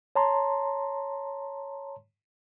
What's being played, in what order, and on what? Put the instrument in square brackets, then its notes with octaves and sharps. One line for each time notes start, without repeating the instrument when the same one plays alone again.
[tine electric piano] C#5 A5 A#5 C6